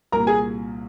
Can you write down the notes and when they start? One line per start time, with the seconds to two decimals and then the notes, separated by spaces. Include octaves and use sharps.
0.12 C2 A#2 A#3 A#4 A#5
0.27 G#4 G#5